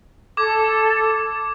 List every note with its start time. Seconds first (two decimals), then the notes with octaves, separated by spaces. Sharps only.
0.37 A4 D6 G#6